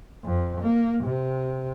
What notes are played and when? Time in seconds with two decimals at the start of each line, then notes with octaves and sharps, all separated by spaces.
0.24 F2
0.61 A#3
1.05 C3